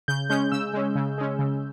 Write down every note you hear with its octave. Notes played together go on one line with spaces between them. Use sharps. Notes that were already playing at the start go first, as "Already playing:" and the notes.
C#3 G6
G#3 C#4 G6
C#3 E6
G#3 C#4
C#3
G#3 C#4
C#3